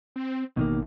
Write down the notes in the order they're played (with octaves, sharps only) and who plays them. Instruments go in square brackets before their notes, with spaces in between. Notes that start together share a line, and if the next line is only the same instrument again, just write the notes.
[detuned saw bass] C4
[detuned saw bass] A1 [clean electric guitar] B2 D#3 A#3